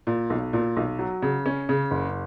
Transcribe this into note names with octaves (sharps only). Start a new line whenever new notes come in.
A#2
B1
A#2
B1
F#3
C#3
C#4
C#3
F#1